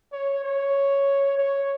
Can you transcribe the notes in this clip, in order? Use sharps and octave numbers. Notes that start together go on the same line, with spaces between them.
C#5
C#5
C#5